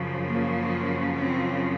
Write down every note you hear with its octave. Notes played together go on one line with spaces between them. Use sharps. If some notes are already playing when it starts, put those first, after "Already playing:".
Already playing: F#2 C#3 F3
A#3
C4